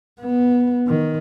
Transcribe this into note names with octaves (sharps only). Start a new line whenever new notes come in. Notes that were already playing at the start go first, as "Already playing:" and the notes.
B3
D#3